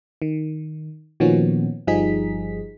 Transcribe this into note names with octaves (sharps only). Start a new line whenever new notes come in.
D#3
A#2 D#3 F3 B3 C#4 F#4
G1 F3 G3 D#4 G#4 B6